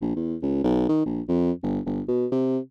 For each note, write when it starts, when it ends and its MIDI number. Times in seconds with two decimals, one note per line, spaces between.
0.01 0.12 34
0.15 0.35 40
0.42 0.59 37
0.64 0.87 35
0.89 1.05 51
1.06 1.21 34
1.28 1.51 41
1.63 1.80 31
1.86 2.01 31
2.08 2.26 47
2.31 2.58 48